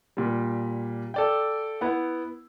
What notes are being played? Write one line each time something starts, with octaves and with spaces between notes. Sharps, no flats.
A#2 G3
A4 D5 G5
B3 E4 F#5